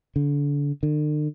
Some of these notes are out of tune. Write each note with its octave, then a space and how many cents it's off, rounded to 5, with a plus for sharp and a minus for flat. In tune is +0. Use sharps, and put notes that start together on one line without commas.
D3 -30
D3 +45